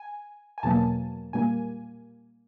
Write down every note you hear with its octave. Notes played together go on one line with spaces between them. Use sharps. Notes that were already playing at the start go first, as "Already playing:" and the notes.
Already playing: G#5
G#5
E2 B2 F#3 A#3 A5
A#2 G3 A#3 G#5